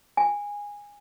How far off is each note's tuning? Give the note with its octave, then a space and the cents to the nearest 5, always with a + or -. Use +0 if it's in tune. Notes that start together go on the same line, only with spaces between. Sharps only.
G#5 -15